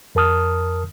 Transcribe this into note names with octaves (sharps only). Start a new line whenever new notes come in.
F2 A#4 A5 D#6 F6